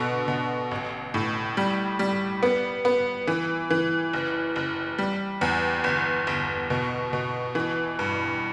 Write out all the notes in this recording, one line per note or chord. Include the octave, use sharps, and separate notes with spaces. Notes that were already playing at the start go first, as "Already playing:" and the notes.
Already playing: B2 D3
B2
A1
A2
G3
G3
B3
B3
E3
E3
F#1
F#1
G3
E2
G1
G1
B2
B2
E3
G2